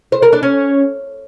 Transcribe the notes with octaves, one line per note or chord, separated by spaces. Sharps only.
C5
A#4
D4
C#4